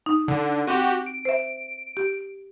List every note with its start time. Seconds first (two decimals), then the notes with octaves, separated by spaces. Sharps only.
0.06 D#4
0.28 D3
0.67 C4 F#4 G4
1.06 D7
1.25 C5 E5
1.97 G4